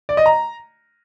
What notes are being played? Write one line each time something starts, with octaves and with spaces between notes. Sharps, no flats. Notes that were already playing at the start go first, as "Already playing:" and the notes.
D5
D#5
A#5